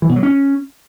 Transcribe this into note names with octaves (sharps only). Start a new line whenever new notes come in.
E3
B2
F#3
C#4